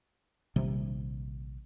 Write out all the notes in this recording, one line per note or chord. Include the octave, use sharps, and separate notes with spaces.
A#1 C3 D#3 G3